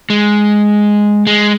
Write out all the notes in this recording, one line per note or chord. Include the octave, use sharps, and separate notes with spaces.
G#3
G#3